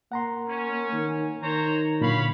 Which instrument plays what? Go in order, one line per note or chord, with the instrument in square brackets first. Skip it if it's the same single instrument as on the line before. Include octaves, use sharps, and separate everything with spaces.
[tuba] A#3 [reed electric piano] F#5 A#5 C6
[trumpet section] C#4
[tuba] D#3
[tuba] D#3 [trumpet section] C5 C#5 A#5
[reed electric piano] A#2 D3 F#3 [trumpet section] C#5 F5 B5